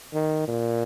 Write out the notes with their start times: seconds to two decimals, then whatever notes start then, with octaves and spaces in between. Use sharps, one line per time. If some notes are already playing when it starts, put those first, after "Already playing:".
0.14 D#3
0.48 A#2